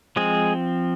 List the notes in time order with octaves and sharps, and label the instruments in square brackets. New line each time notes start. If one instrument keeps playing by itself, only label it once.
[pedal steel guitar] F3 G#3 C4 G#4